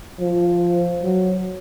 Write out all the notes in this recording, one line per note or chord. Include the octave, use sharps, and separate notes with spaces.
F3
F#3